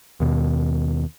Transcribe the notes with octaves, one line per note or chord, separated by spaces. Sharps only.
D#2 B2